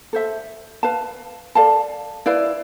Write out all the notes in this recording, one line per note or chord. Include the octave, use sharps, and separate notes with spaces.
A4 C5 E5
B4 F5 A5
A4 D5 F5 A5
E4 B4 D5 F5